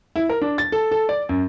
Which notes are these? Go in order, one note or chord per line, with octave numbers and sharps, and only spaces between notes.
E4
A#4
D4
A6
A4
A4
D5
F#2